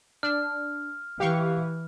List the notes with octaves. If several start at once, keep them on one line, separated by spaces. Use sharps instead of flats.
D4 F6
E3 G4 F5 C#6